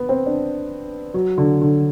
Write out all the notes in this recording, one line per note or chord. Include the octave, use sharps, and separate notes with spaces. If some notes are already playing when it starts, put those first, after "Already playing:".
Already playing: B3
C4
D4
F#3
D3
D3